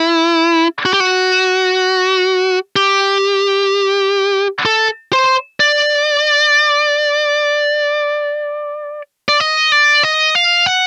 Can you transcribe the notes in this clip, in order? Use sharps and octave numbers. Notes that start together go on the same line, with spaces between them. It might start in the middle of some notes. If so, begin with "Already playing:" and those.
Already playing: E4
F#4
G4
F#4
G4
A4
C5
D5
D5
D#5
D5
D#5
F5
F#5